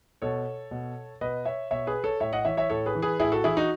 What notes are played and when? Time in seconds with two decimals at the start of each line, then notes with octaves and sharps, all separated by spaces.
0.22 B2 A4 C#5
0.71 B2
1.21 B2 B4 D#5
1.45 C#5 E5
1.71 B2 C#5 E5
1.87 G#4 B4
2.04 A4 C#5
2.20 A2 C#5 E5
2.33 D#5 F#5
2.45 E3 C#5 E5
2.57 C#5 E5
2.69 A2 A4 C#5
2.86 G#4 B4
2.95 E3
3.02 G#4 B4
3.19 A2 E4 G#4
3.32 F#4 A4
3.44 E3 E4 G#4
3.57 D#4 F#4